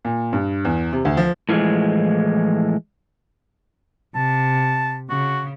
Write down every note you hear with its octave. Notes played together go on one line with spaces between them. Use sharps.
A#2
G2
E2
C3
D2
F3
A2 E3 F3 G3 G#3
C3 A5
C#3 F#4